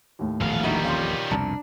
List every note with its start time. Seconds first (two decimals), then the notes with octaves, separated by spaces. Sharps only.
0.19 D#2 A2
0.41 D#1 A#1 E2 B2 F5
0.63 D#3 G3 D#4 E4 F#4
0.84 C3 F3 C#4 F5
1.31 C2 F2 B2 D4 A5 A#5